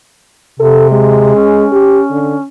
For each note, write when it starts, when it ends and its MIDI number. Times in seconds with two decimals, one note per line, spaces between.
0.60 1.35 48
0.60 0.89 69
0.91 1.66 56
1.36 2.46 61
1.72 2.02 67
2.11 2.34 50